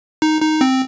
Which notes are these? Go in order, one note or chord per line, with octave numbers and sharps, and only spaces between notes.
D#4
D#4
C4